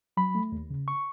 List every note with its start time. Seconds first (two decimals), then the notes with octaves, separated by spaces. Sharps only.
0.17 F#3 B5
0.35 A3
0.52 D#2
0.70 C#3
0.88 C#6